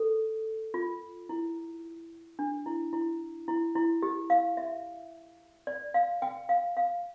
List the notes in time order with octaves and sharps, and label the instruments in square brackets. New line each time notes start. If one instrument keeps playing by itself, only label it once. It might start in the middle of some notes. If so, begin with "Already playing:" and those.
Already playing: [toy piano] A4
F4
E4
D4
E4
E4
E4
E4
G4
F5
E5
D5
F5
G5
F5
F5